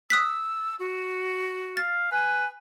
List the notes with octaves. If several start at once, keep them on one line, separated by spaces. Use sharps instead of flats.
D#6 E6 F#6 B6
F#4
F5 A6
B4 G#5